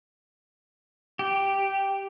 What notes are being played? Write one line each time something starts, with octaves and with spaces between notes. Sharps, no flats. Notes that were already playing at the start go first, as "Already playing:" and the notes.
G4